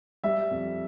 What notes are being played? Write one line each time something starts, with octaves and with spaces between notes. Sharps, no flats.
G3 E5
F2